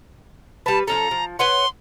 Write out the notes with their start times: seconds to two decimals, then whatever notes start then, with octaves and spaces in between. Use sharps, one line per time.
0.66 G3 B4 A5
0.87 F3 C#4 A4 A#5
1.11 F3
1.39 B4 C#5 F#5 C6